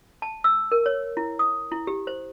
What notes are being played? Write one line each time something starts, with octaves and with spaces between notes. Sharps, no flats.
A5
E6
A#4
C#5
E4
D#6
E4
G4
C5